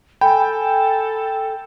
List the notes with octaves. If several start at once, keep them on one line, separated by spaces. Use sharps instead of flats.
A4 G5 G#5 B5